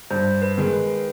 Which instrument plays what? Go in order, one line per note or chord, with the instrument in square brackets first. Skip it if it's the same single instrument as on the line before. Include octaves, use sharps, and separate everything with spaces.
[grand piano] G2 [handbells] C5
[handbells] B4
[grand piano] D#3 G#3
[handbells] B4